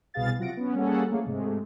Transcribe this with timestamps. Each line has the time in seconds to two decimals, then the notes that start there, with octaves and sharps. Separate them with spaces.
0.14 C2 B2 B3 G#4 F5 A6
0.38 C3 F#3 F4 F#5 A#6 D7
0.57 B3 C#4
0.75 G3 A#3 C#4 G#4 A4 F#5
1.10 F3 A3 A#3 G#4 C#5 F5
1.24 G#2 C3 G#3 A3